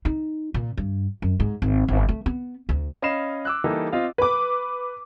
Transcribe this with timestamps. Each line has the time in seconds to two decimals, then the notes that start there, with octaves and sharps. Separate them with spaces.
0.05 D#4
0.54 A#2
0.77 G2
1.22 F#2
1.40 G#2
1.62 G#1
1.88 G1
2.09 A3
2.26 B3
2.69 D2
3.02 C#4 D#5 F5 B5 C7 E7
3.45 D6 E6 F#6
3.64 E3 G3 A#3 D#4 G4 A4
3.92 C4 F4 D#5 F5
4.18 B4 D6